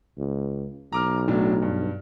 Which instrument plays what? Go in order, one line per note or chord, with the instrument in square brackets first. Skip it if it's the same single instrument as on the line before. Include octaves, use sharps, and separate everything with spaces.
[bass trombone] C#2
[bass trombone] B1 [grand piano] A#5 D6 F6
[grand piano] A2 F#3 D4
G2